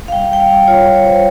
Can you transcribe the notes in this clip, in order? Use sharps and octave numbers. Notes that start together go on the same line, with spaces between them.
F5
G3 G5
G3 G5
F5
G3
F4 C#5
F4
C#5
F4 C5
C#5